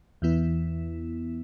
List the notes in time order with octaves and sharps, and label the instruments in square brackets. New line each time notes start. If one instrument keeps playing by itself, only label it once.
[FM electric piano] E2 E3 B3 E4